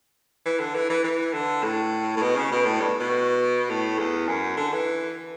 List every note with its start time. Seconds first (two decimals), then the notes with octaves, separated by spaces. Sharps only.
0.46 E3
0.59 D3
0.75 E3
0.90 E3
1.04 E3
1.33 D3
1.63 A2
2.17 A2
2.21 B2
2.36 C#3
2.52 B2
2.65 A2
2.81 G2
3.00 B2
3.69 A2
3.98 E2
4.28 F#2
4.57 D3
4.73 E3